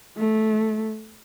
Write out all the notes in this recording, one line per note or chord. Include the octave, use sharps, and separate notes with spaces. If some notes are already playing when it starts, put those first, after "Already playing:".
A3